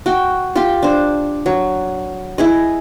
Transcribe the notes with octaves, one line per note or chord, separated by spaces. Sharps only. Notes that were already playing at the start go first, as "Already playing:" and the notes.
F#4 G5
F4 G4 G5 C6
D4 C5
F#3
E4 G#4 D#5